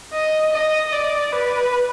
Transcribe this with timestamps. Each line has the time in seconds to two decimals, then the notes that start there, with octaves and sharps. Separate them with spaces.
0.13 D#5
0.53 D#5
0.92 D5
1.32 B4